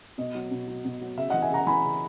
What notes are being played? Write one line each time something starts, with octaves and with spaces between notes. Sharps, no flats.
B2 D#5
F#3
B2
F#3
B2
F#3
C#3 E5
E3 D#5 F#5
E5 G#5
C#3 F#5 A#5
E3 G#5 B5
C#3